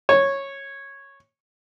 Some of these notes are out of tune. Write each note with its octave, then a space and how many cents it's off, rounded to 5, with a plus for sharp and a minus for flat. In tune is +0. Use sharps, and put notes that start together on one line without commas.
C#5 -10